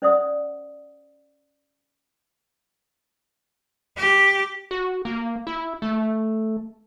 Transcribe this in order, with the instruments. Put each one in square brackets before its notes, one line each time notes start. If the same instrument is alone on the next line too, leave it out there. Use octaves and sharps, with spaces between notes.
[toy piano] C#4 C5 D5 E5 F#5 D#6
[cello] G4
[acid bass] F#4
A#3
E4
A3